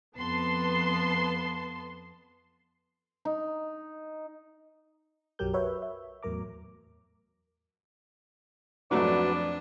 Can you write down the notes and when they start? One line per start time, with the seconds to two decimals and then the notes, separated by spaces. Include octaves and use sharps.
0.16 F2 B3 B4 A5 C6 C7
3.25 D#4
5.39 B1 F#2 F#3 G4 A#4 G6
5.53 F#4 A#4 B4 C#5 E5
5.82 E5
6.23 E2 A2 F#3 A#4 A#5 D6
8.91 F2 G#2 F#3 A3 D4 F#4 B4 D5